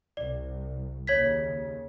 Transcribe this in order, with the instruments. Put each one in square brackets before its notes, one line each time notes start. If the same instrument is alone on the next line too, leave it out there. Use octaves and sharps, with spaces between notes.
[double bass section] C2 [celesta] D5
[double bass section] D#2 C#3 [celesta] C#5 G#6 B6